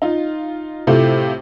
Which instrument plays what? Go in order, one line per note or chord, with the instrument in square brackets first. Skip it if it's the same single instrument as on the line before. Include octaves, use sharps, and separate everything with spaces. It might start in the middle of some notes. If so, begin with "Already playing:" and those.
[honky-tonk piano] D#4 F4
A2 C3 A3 F4